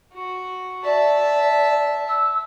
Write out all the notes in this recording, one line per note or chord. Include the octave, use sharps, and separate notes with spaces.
F#4
D5 E5 A5
E6